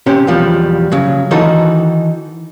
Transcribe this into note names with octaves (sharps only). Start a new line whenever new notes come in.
C3 C#4 G4 C5
E2 B2 F3 G3
C#3 F#3
D#3 E3 D#4 F#4 A4 C5